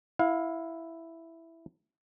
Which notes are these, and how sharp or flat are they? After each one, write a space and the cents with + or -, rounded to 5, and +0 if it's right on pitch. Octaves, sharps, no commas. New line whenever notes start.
E4 +0 F5 +25